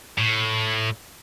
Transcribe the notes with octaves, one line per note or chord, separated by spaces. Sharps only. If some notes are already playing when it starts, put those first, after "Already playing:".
A2